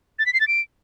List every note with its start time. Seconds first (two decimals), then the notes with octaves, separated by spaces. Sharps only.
0.19 A6
0.26 B6
0.33 C7
0.40 A6
0.48 D7